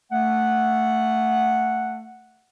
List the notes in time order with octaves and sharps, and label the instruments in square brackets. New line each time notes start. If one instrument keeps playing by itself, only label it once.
[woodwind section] A3 F#5